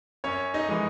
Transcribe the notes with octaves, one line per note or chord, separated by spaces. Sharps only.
F#2 C#4 C#5
D#4 D#5
E3 G#3